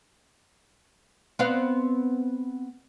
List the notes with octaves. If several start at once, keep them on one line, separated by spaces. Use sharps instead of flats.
B3 C4 F5